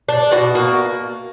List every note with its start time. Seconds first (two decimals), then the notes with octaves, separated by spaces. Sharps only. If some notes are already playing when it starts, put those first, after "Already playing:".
0.09 D4
0.32 B2 F#4
0.55 A#3 F#4